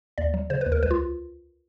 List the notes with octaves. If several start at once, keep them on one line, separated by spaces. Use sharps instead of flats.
D#2 D5
F#3
C#3 C5
B4
D#2
A#4
C#2 B4
F4